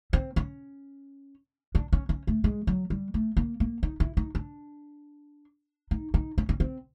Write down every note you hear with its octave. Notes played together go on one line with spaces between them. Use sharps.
C4
C#4
D4
C#4
C#4
A3
G#3
F#3
G3
A3
A#3
A#3
D#4
E4
D#4
D4
D#4
D#4
C#4
C#4
C4